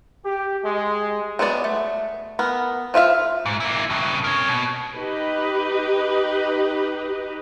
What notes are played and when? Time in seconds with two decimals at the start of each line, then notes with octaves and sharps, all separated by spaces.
0.25 G4
0.64 G#3
1.39 F#3 G#3 B3 D5
1.64 A3
2.39 B3 A#4
2.94 F3 F4 E5 F5
3.46 G#2
3.60 A#3 E4
3.90 G2 C#3
4.24 A#4 C#5
4.48 B2
4.94 D#4 G4 B4 D#5